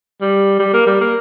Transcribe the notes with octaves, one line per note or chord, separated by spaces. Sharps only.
G3
G3
A#3
G3
A#3